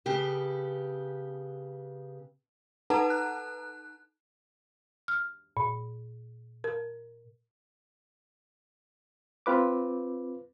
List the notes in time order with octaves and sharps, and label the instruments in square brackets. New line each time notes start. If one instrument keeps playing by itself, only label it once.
[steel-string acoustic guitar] C#3 B3 G4 A4
[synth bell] D#4 A4 B4 F#5 A5 A#5
F#6
[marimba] F6
A#2
A#4
[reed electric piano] C4 F4 B4 D6